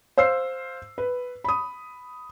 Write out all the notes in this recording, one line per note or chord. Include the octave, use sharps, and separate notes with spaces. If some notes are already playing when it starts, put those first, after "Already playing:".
C5 F5 E6 C7
B4
B5 D#6